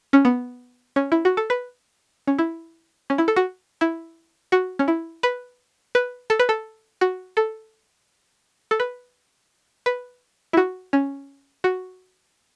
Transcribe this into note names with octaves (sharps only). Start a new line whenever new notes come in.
C#4
B3
C#4
E4
F#4
A4
B4
C#4
E4
C#4
E4
A4
F#4
E4
F#4
C#4
E4
B4
B4
A4
B4
A4
F#4
A4
A4
B4
B4
E4
F#4
C#4
F#4